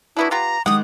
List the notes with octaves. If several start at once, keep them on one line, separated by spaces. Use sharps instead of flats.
F#3 B3 D4 E4
B3 F4 G4 A#5
D#3 G#3 G4 F#5 D#6